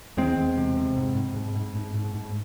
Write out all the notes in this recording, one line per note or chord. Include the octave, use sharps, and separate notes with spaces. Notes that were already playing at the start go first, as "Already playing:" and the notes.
E2 G#3 C4
E2
C3
C3
G#2
G#2
G#2
G#2
G#2
G#2
G#2